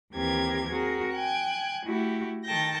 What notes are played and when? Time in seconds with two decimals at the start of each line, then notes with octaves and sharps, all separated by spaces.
0.12 D#2 E3 C4 G4 A#4 G#6
0.70 C4 F#4 G#4 A#4
1.13 G5 G#5 F#6 G#6
1.84 A3 E4 F#4 G4
2.45 D#3 A4 G5 A5 G6 A#6